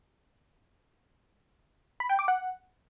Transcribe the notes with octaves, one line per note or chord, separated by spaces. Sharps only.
B5
G5
D6
F#5